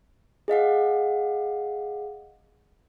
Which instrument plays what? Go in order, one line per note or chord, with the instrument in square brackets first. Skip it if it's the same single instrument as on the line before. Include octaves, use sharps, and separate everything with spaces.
[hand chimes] G#4 D#5 F5 F#5